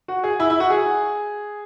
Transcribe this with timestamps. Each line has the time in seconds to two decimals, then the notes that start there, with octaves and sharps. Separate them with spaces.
0.08 F#4
0.24 G#4
0.40 E4
0.50 E4
0.60 F#4
0.70 G#4